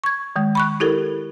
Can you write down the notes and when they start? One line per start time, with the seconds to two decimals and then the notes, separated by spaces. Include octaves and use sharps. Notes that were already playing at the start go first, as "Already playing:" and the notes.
0.04 C#6 G#6
0.36 D#3 G#3
0.55 B5 C#6 F#6
0.80 E4 G4 A4 A#4